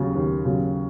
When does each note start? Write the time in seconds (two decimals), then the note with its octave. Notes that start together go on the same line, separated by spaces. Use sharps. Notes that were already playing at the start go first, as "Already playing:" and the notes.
Already playing: D#2 C#3 F#3
0.15 D#2
0.45 C#3 F#3